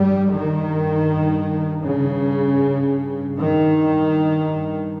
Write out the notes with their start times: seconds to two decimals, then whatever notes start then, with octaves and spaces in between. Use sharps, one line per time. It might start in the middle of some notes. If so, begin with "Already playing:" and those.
Already playing: G2 G3
0.31 D#3
1.85 C#3
2.61 G2
3.37 D#3